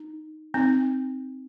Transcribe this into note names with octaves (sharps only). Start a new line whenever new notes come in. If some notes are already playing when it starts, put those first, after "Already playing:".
Already playing: D#4
C4 D#4